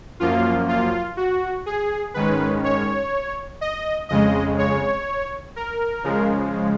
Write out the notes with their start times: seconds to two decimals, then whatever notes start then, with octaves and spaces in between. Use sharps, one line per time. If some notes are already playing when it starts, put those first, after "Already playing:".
0.20 F#2 F3 A#3 F4
0.68 F4
1.17 F#4
1.66 G#4
2.14 G#2 D#3 G#3 C#4 B4
2.64 C#5
3.61 D#5
4.09 F2 C#3 G#3 D#5
4.58 C#5
5.56 A#4
6.04 C#3 F3 G#3